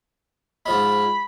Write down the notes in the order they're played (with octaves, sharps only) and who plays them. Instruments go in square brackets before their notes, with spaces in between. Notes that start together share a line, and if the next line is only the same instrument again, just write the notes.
[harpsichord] G#2 F3 G#3 [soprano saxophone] B5